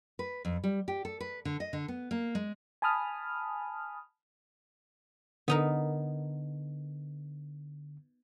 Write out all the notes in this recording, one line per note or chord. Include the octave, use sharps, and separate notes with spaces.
B4
F2
G3
G4
A4
B4
D3
D#5
D3
B3
A#3
G#3
G#5 A5 B5 D#6 F6
D3 B3 D#4 A#4